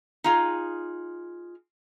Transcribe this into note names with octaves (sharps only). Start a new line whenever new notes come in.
D#4 F4 G#4